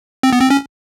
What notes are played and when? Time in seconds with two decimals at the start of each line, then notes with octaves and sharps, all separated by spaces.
0.23 C4
0.33 B3
0.41 C4
0.50 C#4